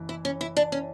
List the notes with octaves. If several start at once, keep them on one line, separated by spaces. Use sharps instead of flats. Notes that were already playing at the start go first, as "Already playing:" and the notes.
Already playing: F#1 E3
E4
C#4
E4
D4
C#4